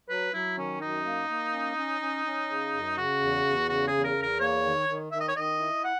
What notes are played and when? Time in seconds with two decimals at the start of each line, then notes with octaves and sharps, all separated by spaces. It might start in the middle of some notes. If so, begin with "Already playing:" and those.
0.09 F#3 B4
0.34 F#3 E4
0.57 D#3 C#4
0.81 F#2 D#4
1.05 A#3
1.29 A#3
1.53 C#4
1.77 C#4
2.01 C#4
2.25 C#4
2.49 C#3
2.73 F#2
2.97 C#3 F#4
3.20 E2
3.45 E2
3.69 C#3 F#4
3.87 G#4
3.93 E2
4.04 A#4
4.17 E2
4.23 A#4
4.40 A#3 C#5
4.64 D#3
4.89 D#3
5.12 D#3 E5
5.20 D#5
5.28 C#5
5.36 D#3 D#5
5.60 E4
5.84 F#5